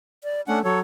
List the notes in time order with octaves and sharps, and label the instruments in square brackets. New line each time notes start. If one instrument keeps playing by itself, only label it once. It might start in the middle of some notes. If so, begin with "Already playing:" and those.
[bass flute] D5
[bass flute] A3 [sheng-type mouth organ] C#4 D4 F#5
[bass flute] F#3 [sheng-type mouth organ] A4 C#5